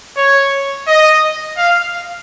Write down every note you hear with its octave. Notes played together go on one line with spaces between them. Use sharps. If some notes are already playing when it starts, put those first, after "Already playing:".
C#5
D#5
F5